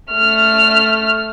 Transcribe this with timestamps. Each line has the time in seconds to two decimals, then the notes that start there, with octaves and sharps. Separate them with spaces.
0.12 A3 F6